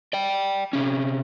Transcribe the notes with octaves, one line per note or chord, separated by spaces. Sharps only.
D5 G5
C3 C#4